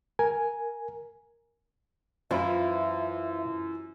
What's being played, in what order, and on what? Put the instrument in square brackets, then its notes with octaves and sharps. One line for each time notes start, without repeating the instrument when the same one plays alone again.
[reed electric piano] A#4 G#5
[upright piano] F#2 [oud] E3 E4 F4 [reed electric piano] C5 F5 B5 [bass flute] E5